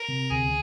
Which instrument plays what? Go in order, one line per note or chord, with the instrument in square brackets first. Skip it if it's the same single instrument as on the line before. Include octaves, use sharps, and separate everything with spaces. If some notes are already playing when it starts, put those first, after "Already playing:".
Already playing: [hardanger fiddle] A#4
[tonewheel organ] C3
[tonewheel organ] D2 [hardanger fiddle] G#4